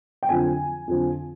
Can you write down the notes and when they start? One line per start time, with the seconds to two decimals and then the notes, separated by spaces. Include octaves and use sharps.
0.23 G5
0.29 F2 D3 F3 G#5
0.88 F2 D3 F3